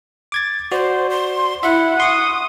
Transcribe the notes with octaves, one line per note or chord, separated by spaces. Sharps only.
D6 G#6 A6
F#4 C5 D5
C6
E4 E5 F#5
C6 C#6 D#6